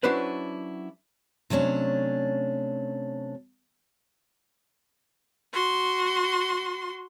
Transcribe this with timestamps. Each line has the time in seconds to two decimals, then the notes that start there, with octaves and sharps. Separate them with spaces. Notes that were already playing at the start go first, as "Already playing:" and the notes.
0.03 F#3 C#4 D4 E4 B4 C5
1.50 C3 F#3 A3 C#4 D4
5.53 F#4 C6